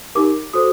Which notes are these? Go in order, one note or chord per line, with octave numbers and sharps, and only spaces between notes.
D#4 G4 A#4 D6
F#4 A4 C5 D#6